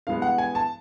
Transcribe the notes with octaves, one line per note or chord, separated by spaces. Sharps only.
G2 E3 G#3 B3 F5
F#5
G#5
A5